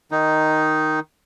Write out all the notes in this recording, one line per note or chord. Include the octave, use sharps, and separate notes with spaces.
D#3 D#4